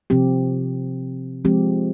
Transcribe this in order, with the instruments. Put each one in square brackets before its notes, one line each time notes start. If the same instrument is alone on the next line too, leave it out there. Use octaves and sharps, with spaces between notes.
[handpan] C3 F3 C4 G4
F3 G#3 C4 G4